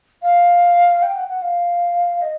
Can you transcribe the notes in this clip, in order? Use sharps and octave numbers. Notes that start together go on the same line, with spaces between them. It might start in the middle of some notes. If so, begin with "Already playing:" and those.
F5
G5
F#5
F#5
F5
D#5